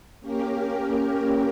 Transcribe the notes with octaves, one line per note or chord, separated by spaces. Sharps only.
A#3 C#4 G4 A#4